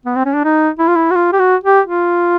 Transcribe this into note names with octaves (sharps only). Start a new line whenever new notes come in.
B3
C4
C#4
D4
D#4
E4
F4
E4
F#4
F4
G4
F#4
G4
F4